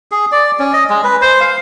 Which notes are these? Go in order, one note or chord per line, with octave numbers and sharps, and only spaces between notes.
G#4
D5
C#4
D#5
G#3
B4
C5
F5